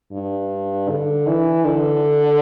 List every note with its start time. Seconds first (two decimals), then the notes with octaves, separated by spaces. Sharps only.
0.12 G2
0.89 D3
1.27 E3
1.65 D3